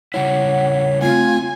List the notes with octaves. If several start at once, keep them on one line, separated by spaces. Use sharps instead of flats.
C#3 G3 E4 C#5 F#5
A3 C4 F4 G#5